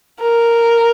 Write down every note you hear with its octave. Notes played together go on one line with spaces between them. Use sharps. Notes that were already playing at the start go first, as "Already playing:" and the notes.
A#4